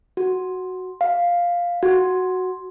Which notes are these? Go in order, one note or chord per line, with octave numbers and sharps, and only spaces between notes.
F#4
F5
F#4